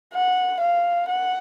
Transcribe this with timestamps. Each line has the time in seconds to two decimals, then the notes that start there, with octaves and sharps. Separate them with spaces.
0.14 F#5
0.61 F5
1.09 F#5